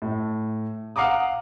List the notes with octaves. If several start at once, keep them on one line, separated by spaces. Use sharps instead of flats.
A2
F5 F#5 A#5 D6 D#6